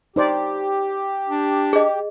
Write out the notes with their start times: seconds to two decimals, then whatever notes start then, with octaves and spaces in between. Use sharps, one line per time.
0.16 D#4 G4 C5 D5
1.29 D4
1.73 G#4 D#5